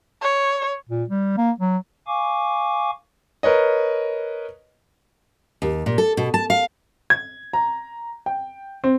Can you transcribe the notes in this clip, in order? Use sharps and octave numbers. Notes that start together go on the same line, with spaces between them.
C#5
A#2
G3
A#3
F#3
F5 G#5 C#6 D6
A#4 B4 C#5 D#5
D#2
A#2
A4
B2
A5
F5
G#6
A#5
G5
C4